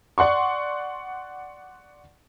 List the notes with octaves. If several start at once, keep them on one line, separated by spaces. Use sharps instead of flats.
D5 F#5 C6 C#6